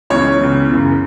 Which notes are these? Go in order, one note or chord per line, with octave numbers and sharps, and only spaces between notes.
C#2 C#3 E3 B3 C#5
C#2 C#3 E3 B3
F#2 C#3 E3 B3